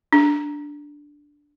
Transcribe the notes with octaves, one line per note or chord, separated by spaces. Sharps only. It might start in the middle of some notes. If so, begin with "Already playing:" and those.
D4